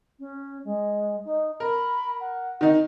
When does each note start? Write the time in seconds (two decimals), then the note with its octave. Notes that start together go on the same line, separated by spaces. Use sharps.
0.19 C#4
0.64 G#3
1.25 D#4
1.60 A#4 B5
2.20 F#5
2.61 D#3 D#4